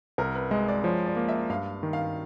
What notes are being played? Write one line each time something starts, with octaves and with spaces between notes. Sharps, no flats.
C2 A#4
B4
G#3 D#5
D5
F3 C#5
D5
A#3
E5
G2 F5
D#3
F5